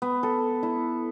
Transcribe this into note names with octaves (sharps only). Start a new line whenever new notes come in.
B3
A4
E4